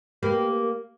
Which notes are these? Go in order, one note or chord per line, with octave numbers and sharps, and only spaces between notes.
A#3 G4 B4